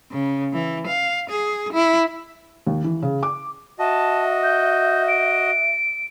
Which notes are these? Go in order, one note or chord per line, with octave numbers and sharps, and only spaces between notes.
C#3
E3
F5
G#4
E4
D#2
E3
C#3
D6
F#4 D#5 E5 A5
G6
D7